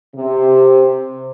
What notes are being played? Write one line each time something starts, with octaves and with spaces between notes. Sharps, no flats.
C3